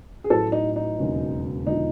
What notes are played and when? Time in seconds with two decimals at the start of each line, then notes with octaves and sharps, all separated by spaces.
0.24 G#4
0.30 A1 A2 F#3 A4
0.52 D#4
0.76 D#4
0.98 E1 D#2 C#3 F#3
1.66 E1 D3 F3 D#4